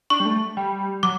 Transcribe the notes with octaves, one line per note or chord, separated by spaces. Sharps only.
D4 C#6
G3
A3
G3
F#3 D6